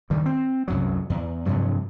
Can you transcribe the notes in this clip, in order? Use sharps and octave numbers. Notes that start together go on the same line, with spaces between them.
D2 D#3 G3
C4
C2 F#2 F#3
E2
G2 C3 F3 F#3